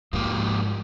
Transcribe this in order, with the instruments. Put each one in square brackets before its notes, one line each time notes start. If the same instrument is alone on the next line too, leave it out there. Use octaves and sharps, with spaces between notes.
[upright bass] G#2 [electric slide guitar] F3 A#3 G4